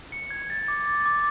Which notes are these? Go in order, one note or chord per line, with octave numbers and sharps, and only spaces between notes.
C#7
G#6
A6
D6
A6
D6